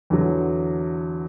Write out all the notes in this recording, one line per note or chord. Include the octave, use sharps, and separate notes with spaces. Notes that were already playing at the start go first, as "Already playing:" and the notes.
E2 D3 F#3